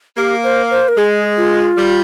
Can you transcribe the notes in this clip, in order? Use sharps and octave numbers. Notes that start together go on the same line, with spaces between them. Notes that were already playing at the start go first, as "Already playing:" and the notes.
A#3 G4
C5
C5
A#4
G#3 G#4
F4
G3